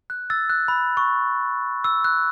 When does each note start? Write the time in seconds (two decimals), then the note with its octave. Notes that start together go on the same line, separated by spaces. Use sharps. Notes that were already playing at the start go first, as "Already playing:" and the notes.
0.10 F#6
0.30 E6 A6
0.50 F#6
0.68 B5
0.97 C#6
1.84 E6
2.04 F#6